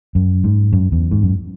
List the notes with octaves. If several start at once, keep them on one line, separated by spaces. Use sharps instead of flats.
F#2
G#2
F#2
E2
G#2
F#2